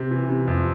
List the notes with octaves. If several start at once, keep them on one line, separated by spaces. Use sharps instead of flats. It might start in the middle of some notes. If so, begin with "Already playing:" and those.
Already playing: C3
E3
C3
F2